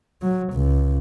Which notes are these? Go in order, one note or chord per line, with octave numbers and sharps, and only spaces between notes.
F#3
C#2